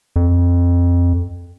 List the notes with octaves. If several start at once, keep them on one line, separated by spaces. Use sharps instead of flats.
F2